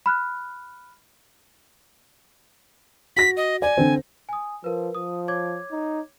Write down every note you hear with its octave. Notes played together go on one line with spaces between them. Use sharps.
B5 F6 F#6
F#4 A#6 B6
D#5
D5 G#5
D3 C4
G#5 D#6
F3 A#4 B4
F3 D#6
C#5 D6 G#6
D#4